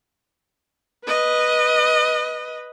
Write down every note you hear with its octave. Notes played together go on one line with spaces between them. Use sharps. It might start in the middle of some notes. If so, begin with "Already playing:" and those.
B4 D#5